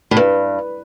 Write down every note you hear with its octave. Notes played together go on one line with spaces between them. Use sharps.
A2
G2 B4